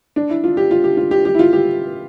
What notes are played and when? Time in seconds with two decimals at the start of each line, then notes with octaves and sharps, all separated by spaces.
0.16 D4
0.30 E4
0.44 F4
0.57 G4
0.71 F4
0.84 G4
0.97 F4
1.11 G4
1.25 G4
1.34 E4
1.39 F4
1.53 G4